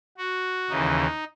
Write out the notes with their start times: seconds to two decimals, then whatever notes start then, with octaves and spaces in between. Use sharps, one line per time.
0.18 F#4
0.69 D#2 C#3 E3 D#4